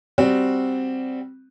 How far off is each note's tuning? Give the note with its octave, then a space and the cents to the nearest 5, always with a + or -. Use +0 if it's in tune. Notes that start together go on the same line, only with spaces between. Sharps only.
G3 +0 C4 +0 F#4 +0